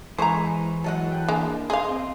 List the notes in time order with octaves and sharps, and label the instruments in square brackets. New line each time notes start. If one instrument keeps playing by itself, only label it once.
[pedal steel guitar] E3 [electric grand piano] G#3 [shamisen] C5 A#5 [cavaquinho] G#5 C#6
[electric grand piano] F#3 G#3 F#4 [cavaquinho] A4 D#5 F#5
[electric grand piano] G5 F#6
[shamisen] G#3 [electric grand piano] A#3 D4
[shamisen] G#4 F5 [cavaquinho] D#5 C6
[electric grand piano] C4